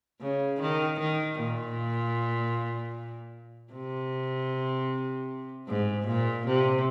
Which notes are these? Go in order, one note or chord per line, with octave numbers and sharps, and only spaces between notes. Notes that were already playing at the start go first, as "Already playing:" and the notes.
C#3
D#3
D#3
A#2
C3
G#2
A#2
C3